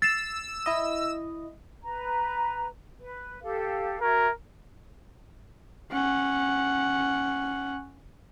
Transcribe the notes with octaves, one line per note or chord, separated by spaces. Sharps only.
E6 A6 C7 E7
E4 D#5
B4 A#5
B4
G4 A4 F5
F#4 A#4 E5 G#6
C#4 F#5